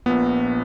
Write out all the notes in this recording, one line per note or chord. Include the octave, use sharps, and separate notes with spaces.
A#1 A#2 B3